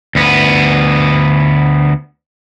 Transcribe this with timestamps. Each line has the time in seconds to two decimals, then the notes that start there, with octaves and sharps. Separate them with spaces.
0.15 D2 B3